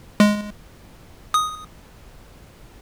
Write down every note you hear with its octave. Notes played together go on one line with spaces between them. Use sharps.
G#3
D#6